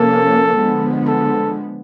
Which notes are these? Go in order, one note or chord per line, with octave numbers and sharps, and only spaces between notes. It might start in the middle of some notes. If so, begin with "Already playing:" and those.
Already playing: C3 F3 A#3 C#4 A4
D3 F3 G#3 B3
A4